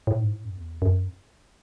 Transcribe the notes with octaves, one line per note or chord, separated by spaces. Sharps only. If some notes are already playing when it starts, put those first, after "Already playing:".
A2
G#2
A2
F#2
E2
F#2